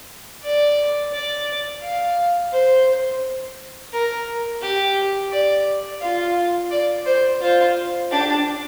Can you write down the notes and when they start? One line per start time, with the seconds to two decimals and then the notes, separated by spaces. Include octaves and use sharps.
0.43 D5
1.13 D5
1.83 F5
2.53 C5
3.93 A#4
4.62 G4
5.32 D5
6.01 F4 F5
6.71 D5
7.06 C5
7.41 F4 C5
8.11 D4 G4